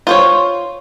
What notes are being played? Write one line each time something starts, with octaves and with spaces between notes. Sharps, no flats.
F4 C5 C#5